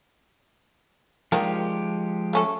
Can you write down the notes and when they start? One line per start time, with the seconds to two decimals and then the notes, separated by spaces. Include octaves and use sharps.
1.32 D#3 F3 G#3 A#3 D4 G4
2.33 A3 C#4 A4